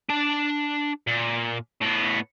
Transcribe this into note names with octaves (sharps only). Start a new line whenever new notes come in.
D4 A5
A#2
A2 B3